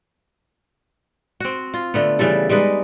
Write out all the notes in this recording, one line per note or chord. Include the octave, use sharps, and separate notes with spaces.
C4 F#4
F4
D3 A3 B3
C#3 E3 G3 A4
G3 G#3 D#4 B4